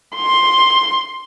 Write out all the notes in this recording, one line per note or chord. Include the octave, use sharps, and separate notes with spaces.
C6